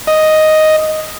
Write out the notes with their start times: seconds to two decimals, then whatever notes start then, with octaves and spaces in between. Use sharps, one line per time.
0.07 D#5